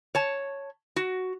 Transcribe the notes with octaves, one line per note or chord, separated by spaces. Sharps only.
C#5 A5
F#4